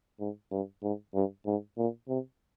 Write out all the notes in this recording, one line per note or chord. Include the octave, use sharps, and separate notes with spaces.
G#2
G2
G#2
G2
G#2
A#2
C3